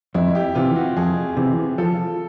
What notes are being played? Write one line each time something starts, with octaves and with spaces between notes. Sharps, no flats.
F2 E4
G4
C3 E3 F4
F#4
F2 G#4
C3 E3
F3 A4